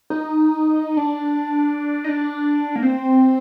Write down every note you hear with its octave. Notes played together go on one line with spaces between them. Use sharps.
D#4
D4
D#4
D4
A#3
C4